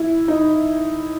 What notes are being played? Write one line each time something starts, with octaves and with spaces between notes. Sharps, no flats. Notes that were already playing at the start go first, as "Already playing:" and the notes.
Already playing: E4
D#4